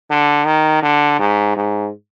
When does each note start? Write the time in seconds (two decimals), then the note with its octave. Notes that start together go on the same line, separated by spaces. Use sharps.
0.10 D3
0.46 D#3
0.83 D3
1.19 G#2
1.57 G#2